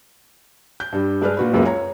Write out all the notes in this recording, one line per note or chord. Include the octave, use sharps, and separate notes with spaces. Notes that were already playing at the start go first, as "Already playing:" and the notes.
G6
G2 G3
G2 G#3 D4 B4 D5 F6
A#2 F#4 B4
C#2 F#2 G#3 A#3 B3
C#5 A#5